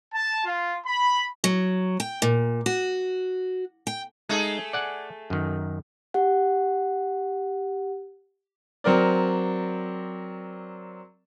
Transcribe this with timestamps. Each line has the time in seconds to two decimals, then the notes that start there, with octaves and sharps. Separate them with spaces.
0.14 A5
0.44 F4
0.85 B5
1.44 F#3
2.00 G5
2.22 A#2
2.66 F#4
3.87 G5
4.29 G#3 A3 D#4 G#4 A4
4.73 D5 F#5 G#5
5.30 F#2 D#3
6.14 G4 F#5
8.84 F#3 C4 A#4 D5